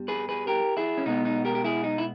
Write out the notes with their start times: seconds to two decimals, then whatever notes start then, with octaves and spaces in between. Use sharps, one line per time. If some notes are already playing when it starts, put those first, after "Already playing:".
Already playing: G2 G3 B3
0.08 G#4 B4
0.29 G#4 B4
0.47 G4 A#4
0.77 E4 G#4
0.98 C#4
1.06 B2 G#3 B3 D#4
1.25 D#4
1.45 G4 A#4
1.55 G4
1.64 E4 G#4
1.84 D#4
1.98 E4